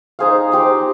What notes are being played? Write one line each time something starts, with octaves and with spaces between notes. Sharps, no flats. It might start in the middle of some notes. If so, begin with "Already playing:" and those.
D#4 G#4 C5 F5
D#4 G4 C5